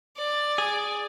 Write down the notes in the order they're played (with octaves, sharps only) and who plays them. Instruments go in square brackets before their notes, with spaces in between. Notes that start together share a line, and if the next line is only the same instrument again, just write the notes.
[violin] D5
[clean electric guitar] G#4